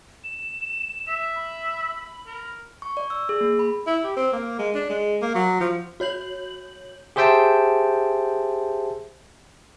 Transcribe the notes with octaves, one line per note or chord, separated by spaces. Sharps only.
E7
E5
B5
A#4
C#6
D5
E6
G#4
A#3
B5
E4
G4
C4
A#3
G#3
D4
G#3
A#3
F#3
F3
F#4 C#5 G6 F#7
G4 G#4 C5 E5 G5 A5